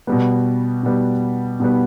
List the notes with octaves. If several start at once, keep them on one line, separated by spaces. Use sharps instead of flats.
B2 G3 B3
B2 G3 B3
B2 G3 B3